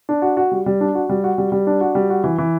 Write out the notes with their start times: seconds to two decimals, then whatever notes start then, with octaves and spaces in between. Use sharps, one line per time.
0.09 D4
0.22 F#4
0.37 F#4
0.51 G3
0.66 G3
0.81 D4
0.95 F#4
1.09 G3
1.24 F#4
1.38 G3
1.52 G3
1.67 D4
1.81 F#4
1.95 G3
2.10 F#4
2.24 E3
2.38 E3